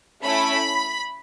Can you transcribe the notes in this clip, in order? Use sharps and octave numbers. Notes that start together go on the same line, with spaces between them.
A3 C#4 E4 B5